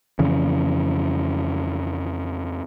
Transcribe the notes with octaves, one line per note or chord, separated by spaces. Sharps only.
F2 C#3 E3